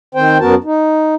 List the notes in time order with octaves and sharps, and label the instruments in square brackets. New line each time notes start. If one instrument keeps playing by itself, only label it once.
[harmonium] D#3 C4 C5 G5
F#2 B3 F#4 A#4 A5
D#4